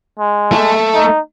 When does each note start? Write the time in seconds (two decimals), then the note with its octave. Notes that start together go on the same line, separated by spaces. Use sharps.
0.19 G#3
0.52 A3
0.94 D#4